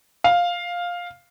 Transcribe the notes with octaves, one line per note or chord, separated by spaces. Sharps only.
F5